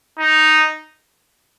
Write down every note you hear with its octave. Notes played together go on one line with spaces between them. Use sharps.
D#4